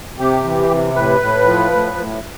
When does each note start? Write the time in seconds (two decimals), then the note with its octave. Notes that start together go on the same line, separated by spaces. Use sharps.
0.18 C3 G4
0.44 E3
0.70 C3
0.95 A2 B4
1.21 A2
1.46 F3
1.72 A2
1.98 A2